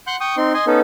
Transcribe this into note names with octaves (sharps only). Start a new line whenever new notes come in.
F#5 C6 F#6 G6
G5 C#6 D#6
C4 D#4 C6
D#5 G#5 C6
B3 C#4 D#4 A4